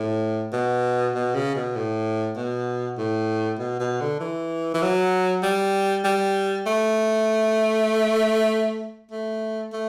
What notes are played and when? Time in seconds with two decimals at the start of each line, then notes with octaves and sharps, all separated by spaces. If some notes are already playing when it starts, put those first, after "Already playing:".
Already playing: A2
0.53 B2
1.15 B2
1.35 C#3
1.55 B2
1.76 A2
2.37 B2
2.98 A2
3.59 B2
3.80 B2
4.01 D3
4.20 E3
4.74 E3
4.82 F#3
5.43 G3
6.04 G3
6.66 A3
9.11 A3
9.73 A3